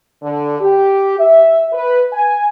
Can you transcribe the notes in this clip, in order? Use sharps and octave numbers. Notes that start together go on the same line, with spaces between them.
D3
G4
E5
B4
G#5